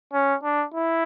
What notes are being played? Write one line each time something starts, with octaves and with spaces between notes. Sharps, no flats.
C#4
D4
E4